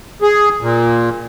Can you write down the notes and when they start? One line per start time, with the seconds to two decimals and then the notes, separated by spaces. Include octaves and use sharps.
0.22 G#4
0.61 A#2